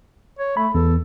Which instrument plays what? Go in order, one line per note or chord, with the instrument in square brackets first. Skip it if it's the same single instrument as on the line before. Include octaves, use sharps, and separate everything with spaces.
[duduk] C#5
[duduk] A3 [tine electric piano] B5
[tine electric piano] E2 [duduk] A4